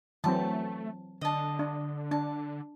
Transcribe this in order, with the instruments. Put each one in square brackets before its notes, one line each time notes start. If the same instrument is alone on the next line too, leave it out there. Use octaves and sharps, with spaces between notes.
[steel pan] E3 F#3 C4 [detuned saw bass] A3 [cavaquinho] A5
[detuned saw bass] D3 [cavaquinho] D#5 A5
[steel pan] D4
[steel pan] D4 [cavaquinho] A5